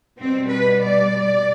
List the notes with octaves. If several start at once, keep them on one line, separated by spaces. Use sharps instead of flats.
B2 G3 C4
B4
D5